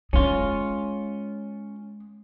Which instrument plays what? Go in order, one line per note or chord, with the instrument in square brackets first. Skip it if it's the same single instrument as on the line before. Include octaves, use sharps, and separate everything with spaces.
[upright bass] G#3 [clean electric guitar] C#4 F4